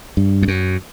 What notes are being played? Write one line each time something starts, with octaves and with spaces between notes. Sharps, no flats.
G2
F2
F#2